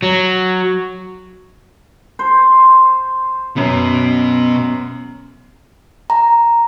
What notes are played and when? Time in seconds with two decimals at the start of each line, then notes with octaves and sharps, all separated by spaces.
0.02 F#3
2.19 C5
3.57 F#2 B2 B3
6.10 A#5